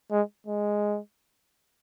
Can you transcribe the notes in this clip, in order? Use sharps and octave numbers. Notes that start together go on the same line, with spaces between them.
G#3
G#3